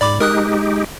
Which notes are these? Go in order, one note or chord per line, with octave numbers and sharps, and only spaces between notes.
G#2 D5 B5 D6
G#3 D#4 G4 A#4 D#6 F#6